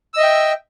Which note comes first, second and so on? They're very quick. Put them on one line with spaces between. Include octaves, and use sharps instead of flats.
E6 D#5 E5 G5